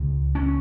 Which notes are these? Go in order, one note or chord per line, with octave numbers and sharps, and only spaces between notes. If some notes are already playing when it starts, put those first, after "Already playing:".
Already playing: C#2
C#4